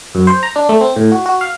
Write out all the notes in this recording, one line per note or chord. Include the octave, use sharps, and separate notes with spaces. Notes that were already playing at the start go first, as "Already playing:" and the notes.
F#2
C5
A#5
D4
A3
C4
A2
F#4
F#4
F5